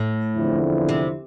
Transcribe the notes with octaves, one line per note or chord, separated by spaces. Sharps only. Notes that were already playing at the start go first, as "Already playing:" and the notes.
Already playing: A2
E2 D3 F3 C4 E4
C3